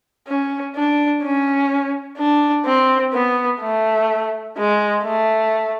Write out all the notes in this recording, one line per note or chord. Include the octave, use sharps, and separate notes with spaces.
C#4
D4
C#4
D4
C4
B3
A3
G#3
A3